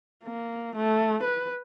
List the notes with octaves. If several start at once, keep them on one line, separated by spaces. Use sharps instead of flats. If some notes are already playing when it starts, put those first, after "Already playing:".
A#3
A3
B4